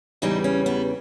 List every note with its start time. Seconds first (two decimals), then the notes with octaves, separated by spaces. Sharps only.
0.22 E2 C#3 E3 G3 D#4
0.44 C#4
0.66 B3